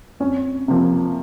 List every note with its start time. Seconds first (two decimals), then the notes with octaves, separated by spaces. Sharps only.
0.20 F2 C#4
0.68 C3 F3 A#3